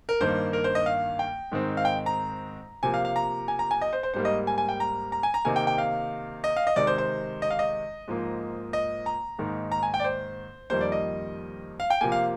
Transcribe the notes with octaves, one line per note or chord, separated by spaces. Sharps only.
A#4
G2 D#3 A#3 C5
A#4
C5
D#5
F5
G5
G#2 D#3 G#3 C4
F5
G5
A#5
C3 F3 A#3 G#5
F5
F5
A#5
G#5
A#5
G#5
D#5
C5
C5
G#2 G3 A#3 C5
D#5
G#5
G#5
G5
A#5
A#5
G#5
A#5
C3 D#3 A#3 G#5
G5
G5
F5
D#5
F5
D#5
C3 D#3 G#3 D5
C5
C5
D#5
F5
D#5
G#2 F3 A#3
D#5
A#5
G#2 D#3 A#3
A#5
G#5
G5
D5
C5
F2 D#3 G3 A#3 C5
D5
D#5
F5
G5
C3 F3 A#3 G#5
F5